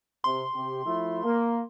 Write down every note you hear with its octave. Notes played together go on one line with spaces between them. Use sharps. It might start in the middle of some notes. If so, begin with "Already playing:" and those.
C3 C6
C3 G4
F3 A3 E4
A#3